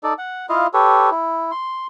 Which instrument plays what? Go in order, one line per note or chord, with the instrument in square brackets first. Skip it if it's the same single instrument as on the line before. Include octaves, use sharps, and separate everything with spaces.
[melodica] D#4 A4 D5
F#5
E4 F4 D#5 F5
G4 A4 B4 C#5
E4
C6